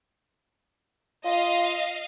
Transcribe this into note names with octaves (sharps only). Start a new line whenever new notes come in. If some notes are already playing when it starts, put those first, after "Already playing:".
F4 D#5 F5